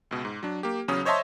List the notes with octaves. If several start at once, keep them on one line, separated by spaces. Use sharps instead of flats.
C#2 B2
G#2
F#3 D4
A#3 G4
E2 C#3 F#3 C#4 D#6
C5 C#5 D#5 E5 A5 C6